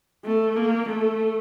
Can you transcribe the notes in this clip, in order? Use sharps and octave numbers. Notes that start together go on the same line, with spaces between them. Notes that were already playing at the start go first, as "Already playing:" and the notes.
A3
A#3
A3